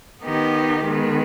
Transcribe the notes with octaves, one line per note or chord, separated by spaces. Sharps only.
D#3 B3 D#4 G4
D#3 G#3 B3